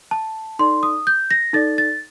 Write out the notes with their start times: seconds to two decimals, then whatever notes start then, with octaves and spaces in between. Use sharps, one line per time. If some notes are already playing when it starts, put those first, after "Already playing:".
0.11 A5
0.59 D#4 A4 D5 C6
0.83 D#6
1.07 G6
1.31 A#6
1.53 D#4 A4 D5 A6
1.78 A6